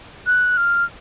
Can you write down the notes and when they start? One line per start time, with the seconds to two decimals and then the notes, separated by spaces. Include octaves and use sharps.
0.26 F#6
0.57 F6